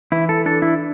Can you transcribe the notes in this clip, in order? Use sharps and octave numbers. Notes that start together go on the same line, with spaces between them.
E3 E4
A4
D4 A4
E4